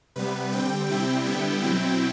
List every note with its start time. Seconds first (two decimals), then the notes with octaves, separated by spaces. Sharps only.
0.16 C3 G3 B3 B4
0.52 D3 G3 C4 G5
0.89 C3 G3 C4 E4
1.25 D3 G3 B3 E4
1.62 B2 F#3 C4 E4 G5